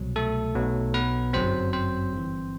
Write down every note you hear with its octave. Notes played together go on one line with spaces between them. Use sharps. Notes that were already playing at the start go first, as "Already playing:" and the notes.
Already playing: C2 B2 F#3
A3 A4
B1 B2 F#3
B3 B4
G1 F#2 F#3 C4 C5
C4 C5
G1 G2 E3